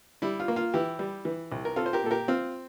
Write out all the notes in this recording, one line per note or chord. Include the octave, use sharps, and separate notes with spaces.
G3 E4
F4
A#3
F4
E3 E4 G4
G3
E3
C2
A#4
C4 F4 A4
C5
G4 A#4
A#2 A4
G4 A#4
C4 F4